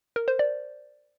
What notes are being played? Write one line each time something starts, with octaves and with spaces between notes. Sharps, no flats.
A#4
C5
D5